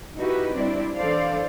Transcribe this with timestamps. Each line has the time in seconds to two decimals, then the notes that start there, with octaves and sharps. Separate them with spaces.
0.17 D#4 E4 F#4 G4 B4
0.55 G3 C4 D4 E4 D5
0.95 E3 D4 A4 C5 D5 F5